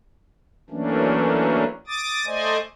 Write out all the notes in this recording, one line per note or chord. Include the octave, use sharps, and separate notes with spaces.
E3 F#3 A3 A#3 C#4 D4
D6 D#6 A6
A3 C5 D5 D#5 G#5